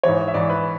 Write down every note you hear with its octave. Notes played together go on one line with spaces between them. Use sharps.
G#2 E3 C#5
E5
G#2 E3 D5
B4